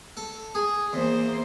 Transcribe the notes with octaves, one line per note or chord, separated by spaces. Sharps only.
A4
G#4
E2 A#3 C5